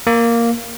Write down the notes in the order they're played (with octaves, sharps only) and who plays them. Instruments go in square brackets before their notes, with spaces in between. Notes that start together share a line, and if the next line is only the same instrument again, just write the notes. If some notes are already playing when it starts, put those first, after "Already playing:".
[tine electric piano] A#3